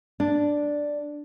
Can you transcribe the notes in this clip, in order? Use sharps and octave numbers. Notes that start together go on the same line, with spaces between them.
D4